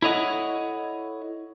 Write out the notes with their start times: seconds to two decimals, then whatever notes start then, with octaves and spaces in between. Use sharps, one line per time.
0.02 E4 A4 C#5 D#5 F#5